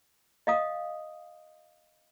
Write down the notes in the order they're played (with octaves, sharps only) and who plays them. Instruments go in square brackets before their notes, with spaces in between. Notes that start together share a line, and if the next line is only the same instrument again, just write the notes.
[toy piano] D#5 F5 D#6